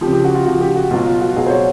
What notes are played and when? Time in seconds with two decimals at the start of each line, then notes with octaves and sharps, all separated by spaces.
0.01 F3 G4
0.06 C#3
0.13 G4
0.25 F#4
0.35 F4
0.46 C#3 F3 F#4
0.61 G4
0.76 F#4
0.91 B2 F#3 F4
1.06 F4
1.21 F#4
1.36 B2 F#3 G#4
1.47 C5
1.50 C#5